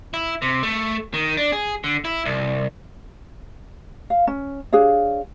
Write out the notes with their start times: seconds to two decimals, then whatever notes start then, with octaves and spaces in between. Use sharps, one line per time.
0.14 E4
0.42 C3
0.63 A3
1.14 D#3
1.37 D4
1.52 G#4
1.84 D3
2.05 E4
2.25 C2
4.10 F5
4.27 C#4
4.73 D4 G#4 C#5 F5